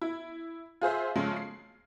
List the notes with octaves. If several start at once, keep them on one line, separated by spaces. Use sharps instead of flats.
E4
F4 G#4 C5 E5
C#3 F3 G#3 A3 C#4
C7